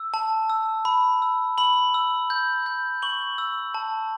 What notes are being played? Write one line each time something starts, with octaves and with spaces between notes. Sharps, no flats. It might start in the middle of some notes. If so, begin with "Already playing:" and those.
Already playing: E6
A5
E6
B5
E6
B5 F#7
E6
G6
G6
C#6 F#7
E6
A5